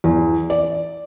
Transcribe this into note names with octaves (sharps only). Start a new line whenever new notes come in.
E2
D5